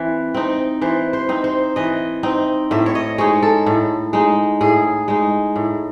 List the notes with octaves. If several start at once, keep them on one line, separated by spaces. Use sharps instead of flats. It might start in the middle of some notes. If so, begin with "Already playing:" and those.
Already playing: E3 C4
C4 D#4
E3 C5
C5
C4 D#4
C5
E3 D#5
C4 D#4
A2 E5
C#5
D#5
G#3 D#4 C#5
A4
A2
G#3 D#4
A2 G#4
G#3 D#4
A2